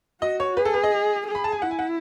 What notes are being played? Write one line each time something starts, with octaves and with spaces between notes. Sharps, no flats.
F#4 D#5
C#5
G#4 B4
A4
B4
D#5
G#4
B5
A5
G#5
E4 F#5
G#5
F#5